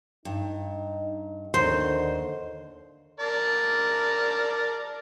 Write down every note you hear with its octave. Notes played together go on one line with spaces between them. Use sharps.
G2 D#4
D#2 D3 C5
A#4 D5 A5